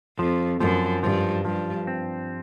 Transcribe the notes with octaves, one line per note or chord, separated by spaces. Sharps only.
F2 F3
F#2 F3
G2 F3
G2 F3
C4